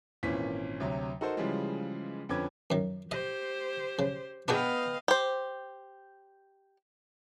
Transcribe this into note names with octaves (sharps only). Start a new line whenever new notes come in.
G#1 A#2 E3 C#4 B6
D2 C3 F#3
D#4 F#4 A4 A#4 C5
C#3 E3 F3 G3 G#3
F2 D3 C#4 B4 D6 G#6
F#2 D#3
G4 C5 D#5
C#3
B3 D4 F#4 G#4 D#5 F5 G5
G4 C5